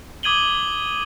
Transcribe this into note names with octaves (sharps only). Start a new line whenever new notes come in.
D6 D#6 G#6 D#7 F#7 G7